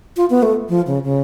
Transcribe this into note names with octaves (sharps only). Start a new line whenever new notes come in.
F4
B3
A3
F3
C#3
C#3